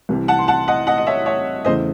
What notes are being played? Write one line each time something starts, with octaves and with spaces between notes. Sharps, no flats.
C2 C3 E3
F#5 A5
C6
F#5 A5
D#5 F#5
D#5 F#5
D#5
C#5 E5
C#5 E5
E2 C#3 E3 A3 C5 D#5